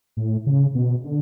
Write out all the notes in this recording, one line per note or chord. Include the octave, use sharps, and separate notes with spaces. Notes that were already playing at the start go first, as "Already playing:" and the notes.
A2
C#3
B2
D3